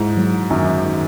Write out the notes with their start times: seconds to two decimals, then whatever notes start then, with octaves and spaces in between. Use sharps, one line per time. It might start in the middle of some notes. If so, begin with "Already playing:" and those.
Already playing: G#2 E4
0.17 F#3
0.50 F#2 D#3
0.84 D#3